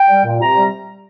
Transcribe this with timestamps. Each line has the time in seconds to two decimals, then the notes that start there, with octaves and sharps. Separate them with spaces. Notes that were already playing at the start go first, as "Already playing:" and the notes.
Already playing: G5
0.09 G3
0.25 A#2
0.40 C3 A#5
0.56 G3